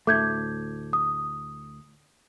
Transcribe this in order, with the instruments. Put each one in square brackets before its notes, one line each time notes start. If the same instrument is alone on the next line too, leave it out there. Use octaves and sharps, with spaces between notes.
[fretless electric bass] D2 A2 A3 [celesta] D6 G6 G#6
[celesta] D#6